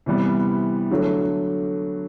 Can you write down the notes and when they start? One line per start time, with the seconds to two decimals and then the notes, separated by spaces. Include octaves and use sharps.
0.06 C3 E3 G3 B3
0.91 D3 F#3 A3